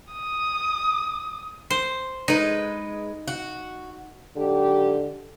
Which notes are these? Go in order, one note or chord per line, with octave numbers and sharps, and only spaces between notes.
D#6
C5
G#3 D#4 B4
F#4
G#2 D3 F#3 G4